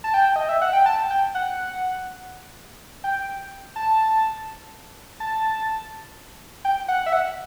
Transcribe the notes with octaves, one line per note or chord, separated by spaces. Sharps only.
A5
G5
D#5
E5
F#5
G5
A5
G5
F#5
G5
A5
A5
G5
F#5
E5
F#5